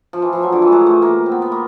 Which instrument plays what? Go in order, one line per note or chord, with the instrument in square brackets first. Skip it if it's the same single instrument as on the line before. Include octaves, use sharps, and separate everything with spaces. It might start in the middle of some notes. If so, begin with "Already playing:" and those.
[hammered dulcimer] F3
E3
F3
F#3
D3
E3
A3
G#3
A3
A#3
C4
B3
B3
A#3